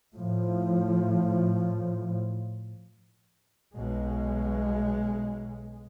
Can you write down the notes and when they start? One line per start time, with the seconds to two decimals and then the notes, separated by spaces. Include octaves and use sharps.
0.15 A2 F3
3.76 B1 B2 G#3